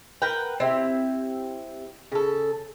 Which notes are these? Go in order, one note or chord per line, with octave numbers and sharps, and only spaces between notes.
A#4 B4 F#5 G5
C4 E4 G4
C#3 A4